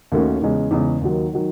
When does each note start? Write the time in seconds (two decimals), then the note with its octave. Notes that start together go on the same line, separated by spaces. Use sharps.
0.12 D#2 D#3 A3 C#4 F#4
0.42 E2 C#3 G#3 C#4
0.71 E2 C#3 G#3 C#4
1.01 D#2 D#3 F#3
1.33 D#3 F#3